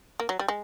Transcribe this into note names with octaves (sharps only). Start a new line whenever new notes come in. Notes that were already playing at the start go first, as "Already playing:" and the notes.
A#3
F#3
G3
G#3